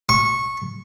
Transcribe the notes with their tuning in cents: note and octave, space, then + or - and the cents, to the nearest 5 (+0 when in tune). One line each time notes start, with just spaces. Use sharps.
C#6 -15